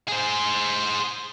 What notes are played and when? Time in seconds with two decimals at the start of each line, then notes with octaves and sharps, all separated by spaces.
0.09 G#4 C5